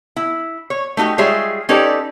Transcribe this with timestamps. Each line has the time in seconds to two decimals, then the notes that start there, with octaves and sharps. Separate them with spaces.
0.16 E4
0.70 C#5
0.97 A3 D#4 F#4 G4
1.18 G3 G#3 F4 G#4 C#5 E5
1.69 C#4 D#4 G4 A4 B4 D5